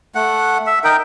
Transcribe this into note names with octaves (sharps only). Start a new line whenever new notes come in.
A3 F#5
E5
D#4 A#4 G5